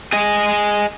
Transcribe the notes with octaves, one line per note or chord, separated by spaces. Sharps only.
G#4 D#5